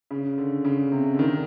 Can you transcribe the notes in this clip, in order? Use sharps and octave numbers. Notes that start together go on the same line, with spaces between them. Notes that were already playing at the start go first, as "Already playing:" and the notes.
C#3
D3
C#3
C3
D3
D#3